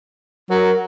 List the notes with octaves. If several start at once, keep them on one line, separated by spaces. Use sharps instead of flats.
F#3 A#4